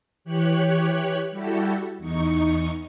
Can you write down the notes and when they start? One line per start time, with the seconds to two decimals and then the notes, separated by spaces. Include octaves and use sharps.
0.25 E3 G4 C#5 F#6
1.31 G3 E4 F#4 G4 A4
1.99 E2 D#4 C#6